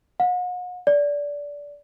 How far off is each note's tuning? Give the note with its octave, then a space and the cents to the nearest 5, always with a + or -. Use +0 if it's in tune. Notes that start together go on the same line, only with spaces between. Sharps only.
F#5 -40
D5 -20